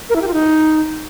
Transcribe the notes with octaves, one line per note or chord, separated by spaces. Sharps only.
A#4
E4
G4
F4
D#4